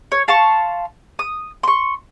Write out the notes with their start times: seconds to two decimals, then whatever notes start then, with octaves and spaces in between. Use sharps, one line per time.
0.12 C#5
0.28 F5 A5 C6 C#6
1.19 D#6
1.63 C6 C#6